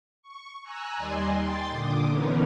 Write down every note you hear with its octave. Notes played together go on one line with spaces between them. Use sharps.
C#6
G#5 A#5 E6 F#6
D#2 G3 D5 D#5 G#5 C6
G5 C6 G6 A6
A#2 D3 D6 D#6
D3 E3 B3 C#4 D#4 A#4